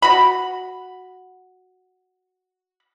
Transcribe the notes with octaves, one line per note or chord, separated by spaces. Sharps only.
F#4 B5